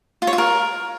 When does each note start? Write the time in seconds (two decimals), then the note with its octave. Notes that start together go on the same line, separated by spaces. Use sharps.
0.22 F4
0.27 C#5
0.33 F4
0.38 A#4